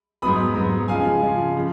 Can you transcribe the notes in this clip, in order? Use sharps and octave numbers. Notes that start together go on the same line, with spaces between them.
G#2 F#3 B3 B5 D#6
G#2 F#3 B3
C#3 F3 G#3 F5 G#5
C#3 F3 G#3
C#3 F3